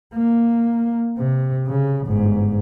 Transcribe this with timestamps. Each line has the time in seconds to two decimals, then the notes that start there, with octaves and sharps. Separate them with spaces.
0.15 A#3
1.17 C3
1.67 C#3
2.06 G1 G#2